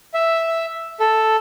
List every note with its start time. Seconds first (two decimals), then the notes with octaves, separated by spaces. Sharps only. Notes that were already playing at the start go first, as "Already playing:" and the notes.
0.14 E5
1.00 A4